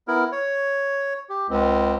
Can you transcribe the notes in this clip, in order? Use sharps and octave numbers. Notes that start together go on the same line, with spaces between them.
B3 E4 A#4
C#5
G4
C#2 C4